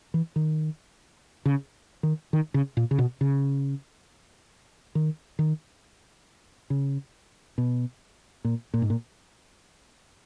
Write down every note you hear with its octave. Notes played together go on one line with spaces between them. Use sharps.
E3
D#3
C#3
D#3
D#3
C#3
A#2
C#3
B2
C#3
D#3
D#3
C#3
B2
A#2
A#2
G#2
A#2